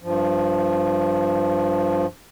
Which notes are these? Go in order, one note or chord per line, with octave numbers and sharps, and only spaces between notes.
G2 F3